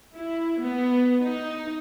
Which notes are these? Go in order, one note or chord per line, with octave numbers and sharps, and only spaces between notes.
E4
B3
D#4